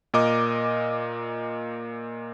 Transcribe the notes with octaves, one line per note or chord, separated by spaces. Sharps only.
A#2 A#4 D#5 D6